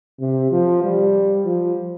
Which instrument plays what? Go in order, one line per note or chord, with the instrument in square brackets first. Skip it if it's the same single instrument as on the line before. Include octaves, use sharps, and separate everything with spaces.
[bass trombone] C3
F3
G3
F3